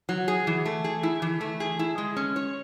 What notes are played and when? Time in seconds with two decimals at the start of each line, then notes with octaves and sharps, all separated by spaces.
0.09 F#3
0.28 G#4
0.47 E3
0.66 A3
0.84 G#4
1.03 E4
1.22 E3
1.41 A3
1.60 G#4
1.79 E4
1.98 G#3
2.16 C#4
2.36 C#5